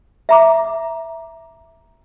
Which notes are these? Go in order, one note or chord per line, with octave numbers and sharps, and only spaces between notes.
E5 A#5 D6